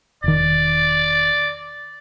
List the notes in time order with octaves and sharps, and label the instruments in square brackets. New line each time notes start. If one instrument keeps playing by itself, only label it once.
[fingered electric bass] E1 D#3 [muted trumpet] D5